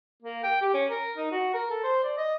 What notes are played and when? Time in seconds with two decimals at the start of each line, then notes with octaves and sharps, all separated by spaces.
0.23 A#3
0.43 G5
0.61 G4
0.74 C#4
0.90 A#4
1.17 D#4
1.32 F#4
1.54 A#4
1.71 A4
1.84 C5
2.04 D5
2.17 D#5